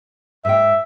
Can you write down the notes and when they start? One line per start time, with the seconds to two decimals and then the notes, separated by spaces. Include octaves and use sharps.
0.45 G#2 B4 E5 G5